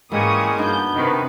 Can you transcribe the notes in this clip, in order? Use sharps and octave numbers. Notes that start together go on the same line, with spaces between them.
G#2 C#3 E3 G3 G#3 A#3 C#6 D#6
G2 B3 D4 D#4 F#4 G6
A2 C3 D#3 B4